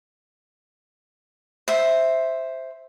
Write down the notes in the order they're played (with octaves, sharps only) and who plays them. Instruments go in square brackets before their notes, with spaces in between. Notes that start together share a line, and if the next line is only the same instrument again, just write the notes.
[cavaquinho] C5 E5